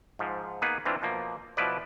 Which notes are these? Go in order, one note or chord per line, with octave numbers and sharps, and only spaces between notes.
G#2 F3
A#3 B3 D#4 G#4 B4
E3 C4 D4 F4
B2 F3 A#3
B2 F3 E4 B4 D5